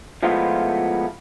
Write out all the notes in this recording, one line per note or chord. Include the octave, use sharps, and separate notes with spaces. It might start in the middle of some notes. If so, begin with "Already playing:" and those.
F3 G#3 A3 B3 E4 F4